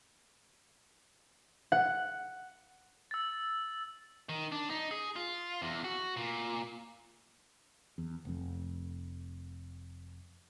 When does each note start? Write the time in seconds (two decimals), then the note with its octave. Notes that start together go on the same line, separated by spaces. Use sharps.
1.72 F#5
3.11 E6 A6
4.29 D#3
4.52 D4
4.70 D#4
4.91 G#4
5.16 F4
5.62 E2
5.84 F#4
6.17 A#2
7.98 E2
8.25 F1 F2